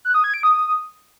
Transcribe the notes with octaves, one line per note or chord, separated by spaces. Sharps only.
F#6
D#6
G#6
D7
D#6